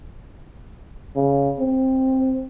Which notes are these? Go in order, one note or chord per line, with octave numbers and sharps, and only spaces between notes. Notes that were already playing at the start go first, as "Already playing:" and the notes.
C#3
C4